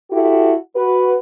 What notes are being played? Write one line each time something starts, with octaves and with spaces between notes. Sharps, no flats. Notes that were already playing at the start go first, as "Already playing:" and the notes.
E4 F#4 G4 A4
F#4 B4